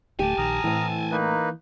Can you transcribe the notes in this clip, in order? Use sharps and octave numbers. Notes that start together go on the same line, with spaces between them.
D1 A3 G4 G#5 A5
A#1 D#3 A#5 D#6 F6
A2 E3 C4
A#3 D#4 B4